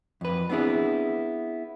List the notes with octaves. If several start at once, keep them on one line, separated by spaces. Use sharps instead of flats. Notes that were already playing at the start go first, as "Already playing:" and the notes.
F2 B4
B3 C4 D4 E4 G#4